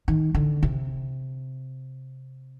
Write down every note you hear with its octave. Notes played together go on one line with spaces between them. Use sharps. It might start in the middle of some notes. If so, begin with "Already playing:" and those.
D#3
D3
C3